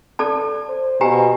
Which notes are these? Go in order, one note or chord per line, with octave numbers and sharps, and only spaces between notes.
A4 D5 A5
C5
B2 G4 G#5 A#5